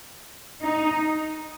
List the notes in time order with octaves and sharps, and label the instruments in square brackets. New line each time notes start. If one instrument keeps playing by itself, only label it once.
[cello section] D#4